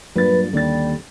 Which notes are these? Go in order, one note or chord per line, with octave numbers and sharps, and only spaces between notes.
G2 A#2 F#3 B4 A6
D#2 D3 G3 C#4 A6